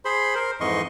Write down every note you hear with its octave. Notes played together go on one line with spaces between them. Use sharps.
G#4 C5 B5 C6
A#4 C5
F2 G#2 E3 D#5 C6 C#6